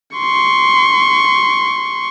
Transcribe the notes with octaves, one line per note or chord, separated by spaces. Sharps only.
C6 C#6